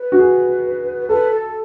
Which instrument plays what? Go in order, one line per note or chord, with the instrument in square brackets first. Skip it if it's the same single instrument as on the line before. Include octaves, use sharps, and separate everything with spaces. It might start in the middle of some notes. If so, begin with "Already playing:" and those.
Already playing: [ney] B4
[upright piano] F#4
G#4
[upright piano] A4 [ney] B4
[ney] A4